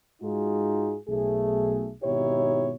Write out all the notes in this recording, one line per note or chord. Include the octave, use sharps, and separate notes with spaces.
G#2 G#3 D#4 F4 F#4 G#4
B1 A3 G#4
G#1 B2 D#4 E4 G4 C#5